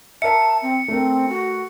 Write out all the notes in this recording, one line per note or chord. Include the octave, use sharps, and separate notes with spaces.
A#4 E5 A5 C#7
C4
A3 C4 A#4
F#4